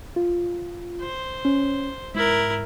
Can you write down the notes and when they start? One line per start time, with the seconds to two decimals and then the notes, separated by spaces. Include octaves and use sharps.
0.16 F4
1.01 C5
1.45 C#4
2.15 G#2 E4 A#4